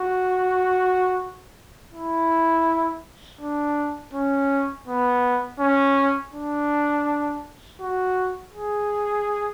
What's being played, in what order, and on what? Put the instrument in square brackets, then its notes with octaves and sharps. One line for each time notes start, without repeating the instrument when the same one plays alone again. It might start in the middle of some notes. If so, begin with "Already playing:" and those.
Already playing: [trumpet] F#4
E4
D4
C#4
B3
C#4
D4
F#4
G#4